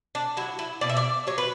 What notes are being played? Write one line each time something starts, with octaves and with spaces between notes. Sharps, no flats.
D4
F#3 E4
E4
B2 D5
E5
D5
F#3 C#5
B4